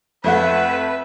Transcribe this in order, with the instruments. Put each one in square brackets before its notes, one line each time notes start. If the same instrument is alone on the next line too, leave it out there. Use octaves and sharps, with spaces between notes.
[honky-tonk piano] F2 A3 F#5 [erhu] B4 [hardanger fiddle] E5